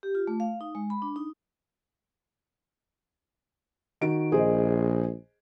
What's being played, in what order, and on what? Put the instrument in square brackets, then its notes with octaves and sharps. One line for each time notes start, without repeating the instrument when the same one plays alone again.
[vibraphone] G4
F4
A3
F5
D#4
G#3
B5
D4
D#4
[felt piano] D#3 F#4 D7
[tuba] A#1 [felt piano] G#4 C5 D#5